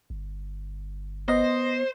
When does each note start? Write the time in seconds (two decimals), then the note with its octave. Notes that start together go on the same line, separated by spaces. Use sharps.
0.10 G1
1.28 B3 C5 D#5 A#6